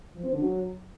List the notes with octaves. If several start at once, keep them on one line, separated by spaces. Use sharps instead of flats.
F3
C4
D3
F#3